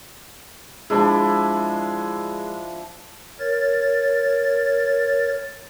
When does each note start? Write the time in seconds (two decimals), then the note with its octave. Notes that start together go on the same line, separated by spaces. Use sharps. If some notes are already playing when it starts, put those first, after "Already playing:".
0.90 F3 G#3 D4 E4
3.39 A#4 C#5 A6